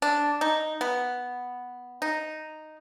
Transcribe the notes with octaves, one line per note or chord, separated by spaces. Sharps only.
D4
D#4
B3
D#4